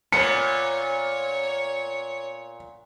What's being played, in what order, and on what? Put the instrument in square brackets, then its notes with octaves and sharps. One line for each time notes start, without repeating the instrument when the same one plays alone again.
[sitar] A#2 B3 [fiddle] C#5 [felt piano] C#7